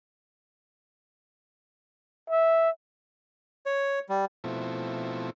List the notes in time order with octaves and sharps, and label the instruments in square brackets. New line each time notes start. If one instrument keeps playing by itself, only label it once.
[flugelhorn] E5
[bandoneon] C#5
G3
[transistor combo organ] B2 F3 A3 C4 E4